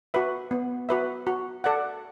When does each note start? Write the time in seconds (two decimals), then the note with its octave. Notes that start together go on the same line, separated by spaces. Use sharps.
0.14 F#4 B4 E5
0.51 B3
0.89 F#4 B4 E5
1.27 F#4
1.64 A4 D5 F#5